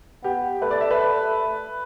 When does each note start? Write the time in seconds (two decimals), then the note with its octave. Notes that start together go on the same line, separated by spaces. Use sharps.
0.24 B3 G4
0.61 A3 B4
0.71 D5
0.81 E5
0.91 B4